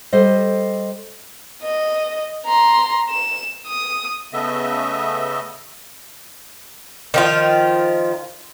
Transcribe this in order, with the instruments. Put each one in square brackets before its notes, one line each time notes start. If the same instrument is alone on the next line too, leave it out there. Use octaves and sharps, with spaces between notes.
[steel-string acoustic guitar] G3 A4 C5 D#5
[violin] D#5
A#5 C6
E7
D#6
[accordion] C#3 A3 B3 D#5 E5
[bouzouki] D#3 F3 F4